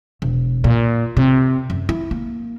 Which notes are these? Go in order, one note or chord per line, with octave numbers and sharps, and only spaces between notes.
E1
A#2
C3
F#2
E4
A#3